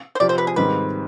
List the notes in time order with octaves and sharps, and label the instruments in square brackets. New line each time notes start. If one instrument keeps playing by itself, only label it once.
[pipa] C5
[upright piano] C3 F3 C4 G4 [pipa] D5
[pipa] C5
B4
G#4
[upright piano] G#2 D#3 G3 C4 G4 [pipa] B4